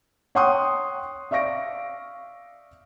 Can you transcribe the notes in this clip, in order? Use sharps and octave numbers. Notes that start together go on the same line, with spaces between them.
C#5 F#5 G5 C6 C#6 D#6
D5 E5 F5 C#6 A#6 D7